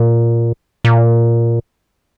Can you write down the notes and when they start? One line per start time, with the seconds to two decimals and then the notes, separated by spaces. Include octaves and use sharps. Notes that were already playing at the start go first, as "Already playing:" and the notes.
Already playing: A#2
0.85 A#2